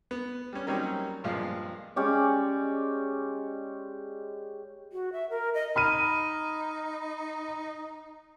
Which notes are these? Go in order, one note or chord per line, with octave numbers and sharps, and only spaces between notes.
B3
G3 C#4
D#3 F#3 G3 A#3 C4 C#4
G2 A#2 F3 G#3 F5
G#3 C#4 G4 D5
F#4
E5
A#4
D#5
D#4 B5 F6 D#7